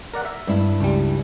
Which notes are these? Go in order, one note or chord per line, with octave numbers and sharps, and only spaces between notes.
A#4 D5 F#5
E5
G2 E4
C#2 G3